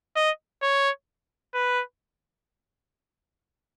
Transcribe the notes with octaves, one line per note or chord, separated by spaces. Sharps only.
D#5
C#5
B4